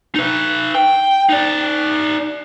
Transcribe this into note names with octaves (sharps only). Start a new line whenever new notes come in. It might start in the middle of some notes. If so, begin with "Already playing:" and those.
D#4 B4
G5
D#4 D5